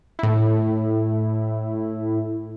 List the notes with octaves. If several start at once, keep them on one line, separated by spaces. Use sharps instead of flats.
A2 E4